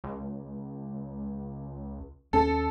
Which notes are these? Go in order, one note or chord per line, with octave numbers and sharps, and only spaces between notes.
C#2
D#2 C#4 A4